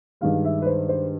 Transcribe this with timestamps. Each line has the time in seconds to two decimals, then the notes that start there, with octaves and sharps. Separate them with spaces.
0.21 G2 D#3 G#3 F5
0.44 E5
0.62 B4
0.66 C5
0.89 C5